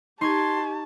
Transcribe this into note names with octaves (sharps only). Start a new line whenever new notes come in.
D#4 G4 A5 C6 C#6 G#6